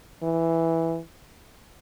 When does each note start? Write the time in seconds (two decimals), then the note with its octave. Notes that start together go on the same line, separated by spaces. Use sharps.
0.23 E3